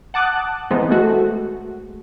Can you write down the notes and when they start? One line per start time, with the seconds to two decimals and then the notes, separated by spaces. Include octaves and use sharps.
0.14 F#5 A5 D6 D#6 F#6
0.71 E3 G#3 B3 C4 D#4
0.90 G#3 A3 F#4